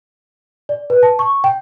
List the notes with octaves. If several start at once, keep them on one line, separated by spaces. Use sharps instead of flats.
D5
B4
A5
C#6
G5